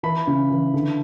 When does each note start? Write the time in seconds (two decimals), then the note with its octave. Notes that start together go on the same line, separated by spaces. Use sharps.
0.03 E3 B5
0.27 C#3
0.51 E3
0.74 D3